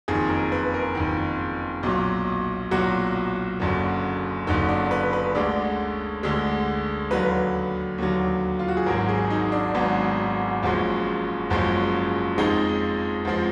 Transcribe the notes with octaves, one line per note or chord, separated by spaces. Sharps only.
F#1 F2 D#3 G#4
A#4
B4
A#4
F#1 F2 D#3
B1 A#2 F#3
B1 A#2 F#3 F#4
F#1 F#2 D3
F#1 F#2 D3 D#4
D4
B4
B4
D2 D3 G#3 D5
D2 D3 G#3
D#2 D3 F#3 B4
D#2 D3 F#3
F4
F#4
G#4
G#1 G#2 F#3 A#4
G#4
D#4
D4
G#1 G#2 F#3 B3
F#1 F#2 F3 G#3
F#1 F#2 F3 G#3
F2 F3 G#3 D#4
F2 F3 G#3